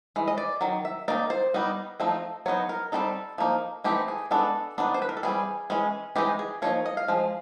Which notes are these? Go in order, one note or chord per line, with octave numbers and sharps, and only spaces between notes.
E3 G#3
D#5
D5
D#3 F#3
E5
D#3 F#3 A#3 D#4 D5
C5
G3 B3 D#4
F3 A3 C4 D#4
F#3 B3 D#4 C#5
A#4
G3 C4 D#4 A4
F3 A#3 D#4
E3 A3 C4 D#4 G4
G#4
G#3 B3 D4 A4
D#3 F#3 B3 D4
C5
B4
A#4
A4
E3 G3 C4 G#4
E3 G#3 C#4
E3 G#3 C4 D#4 G4
G#4
F3 A#3 D#4 C#5
D#5
F5
F3 G#3